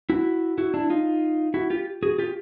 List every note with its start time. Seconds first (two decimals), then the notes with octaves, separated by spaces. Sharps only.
0.10 E4 F#4
0.58 E4 F#4
0.74 D4 E4
0.90 D#4 F4
1.54 E4 F#4
1.70 F4 G4
2.03 F#4 G#4
2.18 F4 G4